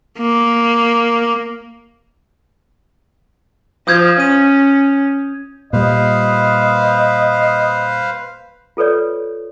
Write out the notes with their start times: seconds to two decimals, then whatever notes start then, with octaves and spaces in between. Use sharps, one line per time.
0.18 A#3
3.88 F3 D#6 G6 G#6
4.20 C#4 D#7
5.73 A#2 G3 B4 C5 D#5 F5
8.77 F4 A4 B4 C#5 D5